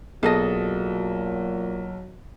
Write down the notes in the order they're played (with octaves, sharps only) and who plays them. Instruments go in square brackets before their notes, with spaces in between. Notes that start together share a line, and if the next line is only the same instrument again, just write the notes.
[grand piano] B1 [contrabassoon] A#2 [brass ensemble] F#3 [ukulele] G#4 A4 D#5